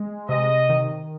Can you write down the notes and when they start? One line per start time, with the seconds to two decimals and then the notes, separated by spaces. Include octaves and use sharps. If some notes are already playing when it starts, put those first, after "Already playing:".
Already playing: G#3
0.29 C3 D#5
0.69 D#3